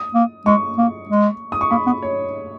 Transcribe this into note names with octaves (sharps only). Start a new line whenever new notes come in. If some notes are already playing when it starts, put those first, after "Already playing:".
Already playing: D#6
A#3
G#3 C#6
A#3
G#3
D#6
C#6
A#3 B5
B3
C#5